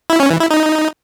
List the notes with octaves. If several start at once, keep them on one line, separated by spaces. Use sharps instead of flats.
E4
C#4
E3
E4
D#4